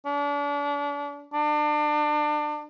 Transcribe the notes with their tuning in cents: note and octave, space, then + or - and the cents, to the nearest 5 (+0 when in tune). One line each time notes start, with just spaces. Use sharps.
D4 -35
D4 +30